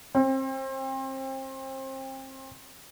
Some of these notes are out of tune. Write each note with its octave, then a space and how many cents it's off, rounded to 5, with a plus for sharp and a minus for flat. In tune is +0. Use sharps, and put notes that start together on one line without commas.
C4 +35